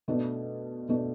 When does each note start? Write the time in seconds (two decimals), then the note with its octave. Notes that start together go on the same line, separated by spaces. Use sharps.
0.08 B2 A3 D4
0.88 B2 A3 D4